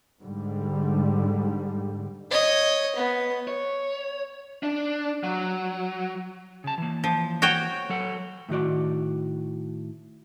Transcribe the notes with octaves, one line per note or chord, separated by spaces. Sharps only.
G#2 D3 G3
C#5 D#5
B3
C#5
D4
F#3
C#3 A5
E3 A#3
F3
F#4 C#5 G5
F#3 A4 F#5
A2 D#3 F#4 D5